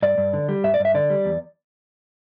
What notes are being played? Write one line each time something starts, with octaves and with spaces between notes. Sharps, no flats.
G2 D5
G2
D3
G3
G2 E5
D5
G2
E5
D3 D5
G3
E2